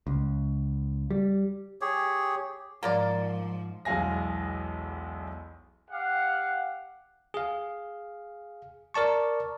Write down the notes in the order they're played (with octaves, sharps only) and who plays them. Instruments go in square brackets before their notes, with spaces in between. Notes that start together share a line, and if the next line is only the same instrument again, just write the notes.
[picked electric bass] C#2
G3
[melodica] G4 G#4 C#5
[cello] G#2 F3 [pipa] A#3 A#4 D5
[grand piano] B1 E2 G#3 F5 G#5 A#6
[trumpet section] G4 F5 F#5
[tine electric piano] G#4 F5
A#4 D5 A5 C#6